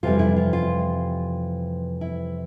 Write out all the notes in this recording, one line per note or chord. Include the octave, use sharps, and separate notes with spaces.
F2 C3 E3 G3 F4
E4
F4
F4
E4